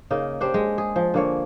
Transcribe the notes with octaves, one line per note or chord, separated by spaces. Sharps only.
C#3 A#3 D#4
D4 G4 C5
G#3
G#4
F3
D3 A#3 C#5